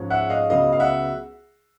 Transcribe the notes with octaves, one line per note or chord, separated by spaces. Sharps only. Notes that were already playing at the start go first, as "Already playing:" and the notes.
Already playing: G#2 F3 G#3 C#4
E5 F#5
D#5 F5
C#2 C#3 F#3 B3 D#5 F5
F5
E5 F#5